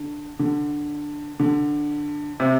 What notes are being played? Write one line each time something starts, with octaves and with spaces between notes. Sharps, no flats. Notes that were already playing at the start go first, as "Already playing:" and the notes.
Already playing: D3
D3
D3
C3